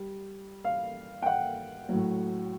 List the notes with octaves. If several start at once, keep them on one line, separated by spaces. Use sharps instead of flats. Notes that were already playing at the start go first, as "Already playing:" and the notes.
Already playing: G3
F5
G5
F#5
A2 F#3